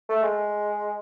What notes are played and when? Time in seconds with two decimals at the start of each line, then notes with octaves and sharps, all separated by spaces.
0.09 A3
0.23 G#3